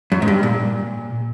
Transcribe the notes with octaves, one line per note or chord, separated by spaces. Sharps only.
F#2
G#2
G2
A#2